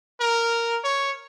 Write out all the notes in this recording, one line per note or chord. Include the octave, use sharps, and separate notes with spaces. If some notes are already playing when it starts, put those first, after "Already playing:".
A#4
C#5